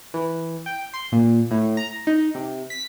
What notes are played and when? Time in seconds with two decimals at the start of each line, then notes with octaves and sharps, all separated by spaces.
0.14 E3
0.66 G5
0.94 C6
1.12 A#2
1.51 A2
1.77 A#5
2.07 D#4
2.35 C3
2.70 B6